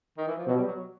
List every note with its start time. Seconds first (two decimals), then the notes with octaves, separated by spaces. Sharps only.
0.18 D#3
0.27 E3
0.38 F3
0.47 B2 F#3
0.57 G3
0.67 F#3